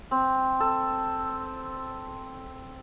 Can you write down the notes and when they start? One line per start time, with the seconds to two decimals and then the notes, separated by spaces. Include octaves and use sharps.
0.11 C4
0.60 A4